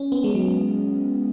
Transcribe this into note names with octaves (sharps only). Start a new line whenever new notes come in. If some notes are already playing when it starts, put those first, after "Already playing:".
Already playing: C#4
B3
G#3
F#3